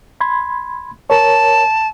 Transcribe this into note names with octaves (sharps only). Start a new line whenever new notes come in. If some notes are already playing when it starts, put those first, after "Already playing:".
B5 C6 G#6
A#4 C#5 A5